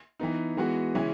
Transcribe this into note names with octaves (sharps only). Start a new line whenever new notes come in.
E3 B3 D#4
E3 G#3 B3 F#4
C#3 E3 G#3 C#4 E4